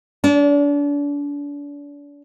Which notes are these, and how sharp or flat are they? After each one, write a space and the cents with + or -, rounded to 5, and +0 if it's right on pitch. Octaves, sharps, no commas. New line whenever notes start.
D4 -35